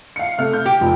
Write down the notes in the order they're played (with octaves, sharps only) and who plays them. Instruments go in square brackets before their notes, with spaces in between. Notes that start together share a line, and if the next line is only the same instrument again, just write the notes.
[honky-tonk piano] F5 C#7
C3 A3 F6
G6
[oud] G4
[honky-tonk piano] F1 F2